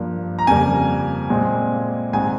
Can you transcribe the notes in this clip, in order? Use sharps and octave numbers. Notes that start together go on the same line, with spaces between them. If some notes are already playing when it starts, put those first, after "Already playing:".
Already playing: G2 F3 A#3
A#5
F2 C#3 G3 A#3 G#5
A#2 G#3 C4
G#2 G3 C4 G#5